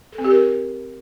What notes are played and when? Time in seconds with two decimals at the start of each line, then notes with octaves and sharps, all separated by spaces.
0.12 A4
0.18 C4
0.24 G4
0.30 A#4